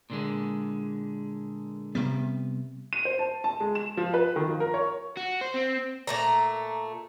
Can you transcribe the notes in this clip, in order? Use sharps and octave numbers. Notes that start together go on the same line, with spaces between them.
A#2 D3 G#3
C3 G3 B3
D#7
C5
A5
A5
G#3
E7
F3
B4
D#3
F3
A#4
C#5
F#4
C5
C4
A#2 A3 A#5